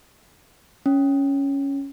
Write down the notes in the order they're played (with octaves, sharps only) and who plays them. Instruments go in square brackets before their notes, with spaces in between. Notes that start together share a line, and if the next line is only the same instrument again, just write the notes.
[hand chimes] C#4